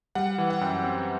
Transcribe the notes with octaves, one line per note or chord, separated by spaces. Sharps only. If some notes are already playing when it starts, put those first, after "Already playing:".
G3 F#5
E3
F#5
F#2 G5
C4